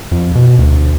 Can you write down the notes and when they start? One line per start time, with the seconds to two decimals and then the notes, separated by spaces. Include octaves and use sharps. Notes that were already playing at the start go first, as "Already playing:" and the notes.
0.11 F2
0.35 B2
0.59 D2